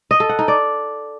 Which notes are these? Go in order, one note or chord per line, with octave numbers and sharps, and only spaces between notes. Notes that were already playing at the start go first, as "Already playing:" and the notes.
D#5
A4
F#5
D#4
D5